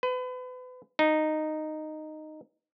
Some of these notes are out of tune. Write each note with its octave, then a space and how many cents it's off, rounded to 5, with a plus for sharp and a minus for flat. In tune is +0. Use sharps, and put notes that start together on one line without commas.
B4 +35
D#4 -10